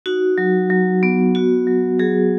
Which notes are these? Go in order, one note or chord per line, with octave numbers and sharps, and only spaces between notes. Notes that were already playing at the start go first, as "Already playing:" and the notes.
D#4 F#4
F#3
F#3
B3
F#4
F#3
F#3 G#4